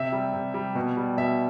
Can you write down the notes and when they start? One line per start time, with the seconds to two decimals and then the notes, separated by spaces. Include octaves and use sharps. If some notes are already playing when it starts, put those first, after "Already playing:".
Already playing: C3 E5
0.12 G3
0.34 C3
0.54 G3
0.75 B2
0.97 G3
1.17 B2 E5